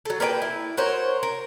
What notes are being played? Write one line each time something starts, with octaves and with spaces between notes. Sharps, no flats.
F#3 A4
A#3 B4 C#5 G5
E4
F#4 A#4 C5 C#5
A#4